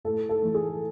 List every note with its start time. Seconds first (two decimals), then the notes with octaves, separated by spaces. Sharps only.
0.05 A2 A4
0.29 A4
0.43 E3 A3
0.54 G#4